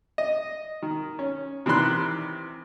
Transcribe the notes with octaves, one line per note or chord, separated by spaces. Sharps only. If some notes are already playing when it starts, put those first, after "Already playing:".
D#5
D#3
C#4
C3 D#3 E3 B5 C6 F#6